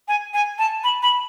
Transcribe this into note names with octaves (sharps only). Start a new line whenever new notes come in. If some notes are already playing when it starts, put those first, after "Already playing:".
G#5
G#5
A5
B5
B5